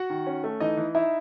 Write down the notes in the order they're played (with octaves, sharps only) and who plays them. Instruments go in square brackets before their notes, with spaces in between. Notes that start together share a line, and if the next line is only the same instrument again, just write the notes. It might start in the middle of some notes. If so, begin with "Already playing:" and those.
Already playing: [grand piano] F#4 F#5
D#3
C#4
A3
E3 D#4 D#5
E3
D#4 E4 E5